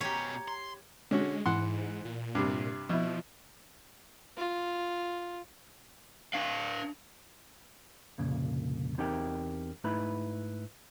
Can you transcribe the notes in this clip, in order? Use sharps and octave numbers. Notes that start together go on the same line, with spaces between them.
B2 C#4 G4 C#5 A#5
C6
D3 G#3 C#4 F#4
G#2 E3 F#5 C6
A#2
G2 C3
B2 F3 E4
F4
D4 F5
C2 F2 A#2 C#3
E2 C4 D#4 G4 A#4 G5
G#2 A3 D#4 E4 B4 B5